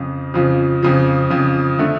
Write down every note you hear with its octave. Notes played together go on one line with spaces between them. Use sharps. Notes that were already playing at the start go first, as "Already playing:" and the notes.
Already playing: F2 C#3 F3
F2 C#3 F3
F2 C#3 F3
F2 C#3 F3
D3 A3